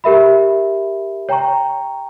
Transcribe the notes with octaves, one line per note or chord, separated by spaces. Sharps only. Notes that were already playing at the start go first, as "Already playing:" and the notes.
G4 A#4 E5 B5
C#5 G5 A#5 C#6